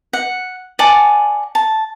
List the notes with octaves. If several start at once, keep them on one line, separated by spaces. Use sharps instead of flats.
F#5
D5 F#5 G#5 A5
A5